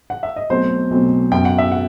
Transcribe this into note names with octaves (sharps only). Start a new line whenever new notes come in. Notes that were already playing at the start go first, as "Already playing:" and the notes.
F#5
E5
D#5
B1 B2 F#3 A3 C4 C5
B1 B2 F#3 A3 C4
F#2 F#3 B3 G5
F#5
E5
F#5